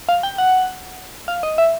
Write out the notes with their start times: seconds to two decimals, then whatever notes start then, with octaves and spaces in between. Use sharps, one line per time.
0.09 F5
0.23 G5
0.38 F#5
1.28 F5
1.43 D#5
1.58 E5